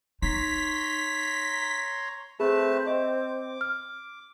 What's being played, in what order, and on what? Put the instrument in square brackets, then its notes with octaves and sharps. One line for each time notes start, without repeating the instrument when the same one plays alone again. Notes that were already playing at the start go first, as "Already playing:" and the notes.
[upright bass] D#4 [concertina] C#5 A#5 C6 [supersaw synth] B6
[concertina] A3 B4 A5 [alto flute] C4 [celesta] G#4
[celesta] D#5 [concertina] D6
[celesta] F6